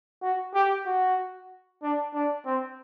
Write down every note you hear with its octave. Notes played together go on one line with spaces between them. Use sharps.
F#4
G4
F#4
D4
D4
C4